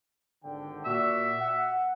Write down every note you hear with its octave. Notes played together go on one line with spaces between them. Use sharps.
G#1 D3 G5
A#2 F#4 D5 E5
F#5